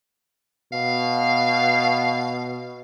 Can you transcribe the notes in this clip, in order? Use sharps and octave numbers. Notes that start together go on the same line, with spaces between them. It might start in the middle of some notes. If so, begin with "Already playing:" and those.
B2 F5